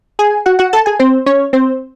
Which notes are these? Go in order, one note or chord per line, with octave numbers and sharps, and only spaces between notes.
G#4 G#5
F#4 F#5
F#4 F#5
A4 A5
G#4 G#5
C4 C5
C#4 C#5
C4 C5